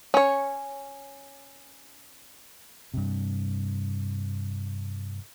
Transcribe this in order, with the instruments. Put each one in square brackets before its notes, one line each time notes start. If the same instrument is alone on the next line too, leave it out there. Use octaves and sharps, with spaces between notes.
[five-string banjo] C#4 C#5
[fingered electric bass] G2 C3